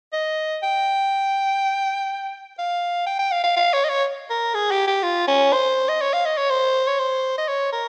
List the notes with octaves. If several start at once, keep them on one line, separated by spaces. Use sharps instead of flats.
D#5
G5
F5
G5
G5
F5
F5
F5
C#5
D#5
C#5
A#4
G#4
G4
G4
F4
C#4
C5
D#5
C#5
F5
D#5
C#5
C5
C#5
C5
D#5
C#5
A#4